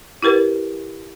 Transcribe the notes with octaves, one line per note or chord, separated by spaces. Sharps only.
E4 G4 A#4 B4